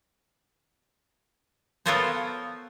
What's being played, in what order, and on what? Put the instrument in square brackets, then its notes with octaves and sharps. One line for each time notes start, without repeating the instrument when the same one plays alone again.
[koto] B3 F4 A4 A#4 C5 C#5